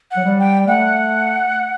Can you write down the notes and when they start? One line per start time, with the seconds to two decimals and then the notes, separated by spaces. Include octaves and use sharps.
0.11 F#5
0.17 F#3
0.25 G3
0.39 G5
0.67 A3 F#5